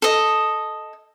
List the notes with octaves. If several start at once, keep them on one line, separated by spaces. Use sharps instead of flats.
A4 D#5